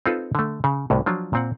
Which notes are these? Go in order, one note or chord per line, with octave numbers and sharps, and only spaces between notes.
C4 D#4 F4 A4 B4
D3 A3
C#3
C2 A2 C3
F3 F#3 D4 F4
A#2 C4 F#5